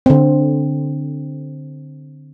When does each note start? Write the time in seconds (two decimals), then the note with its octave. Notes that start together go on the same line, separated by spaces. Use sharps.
0.06 D3 C4